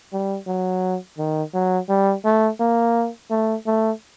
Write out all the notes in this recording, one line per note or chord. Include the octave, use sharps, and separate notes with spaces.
G3
F#3
D#3
F#3
G3
A3
A#3
A3
A3